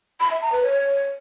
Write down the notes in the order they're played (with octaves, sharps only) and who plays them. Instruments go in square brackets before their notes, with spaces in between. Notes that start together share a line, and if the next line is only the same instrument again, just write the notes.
[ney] B5
E5
A#5
B4
C#5